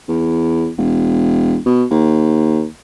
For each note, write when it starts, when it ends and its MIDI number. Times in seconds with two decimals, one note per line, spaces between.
0.08 0.69 40
0.78 1.57 28
1.65 1.84 47
1.91 2.65 39